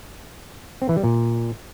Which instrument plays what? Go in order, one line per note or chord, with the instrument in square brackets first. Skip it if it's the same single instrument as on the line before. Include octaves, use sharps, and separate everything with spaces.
[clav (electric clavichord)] C4
E3
G3
A#2